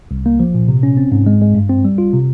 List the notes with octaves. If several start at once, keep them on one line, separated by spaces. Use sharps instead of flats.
C2
A#3
F3
A#2
C3
C#4
C4
G#2
G#3
G#3
G2
C4
G3
F4
C3